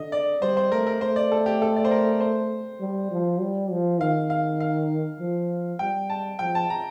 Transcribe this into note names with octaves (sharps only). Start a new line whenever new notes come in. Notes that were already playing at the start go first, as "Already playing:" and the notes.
Already playing: D3 D#5
D5
G3 C5
C5
A3 A#4
A#4
A3 C5
D5
A4
G4
A4
D5
C5
A#4
C5
G3
F3
G3
F3
D#3 F5
F5
F5
F3
G3 G5
A5
F3 G5
A5
A#5